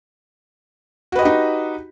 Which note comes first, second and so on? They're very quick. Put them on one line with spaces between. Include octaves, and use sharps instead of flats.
F#4 B4 D#5 G4 D#4